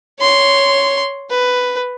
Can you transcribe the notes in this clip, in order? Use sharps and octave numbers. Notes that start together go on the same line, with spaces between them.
C#5 C6
B4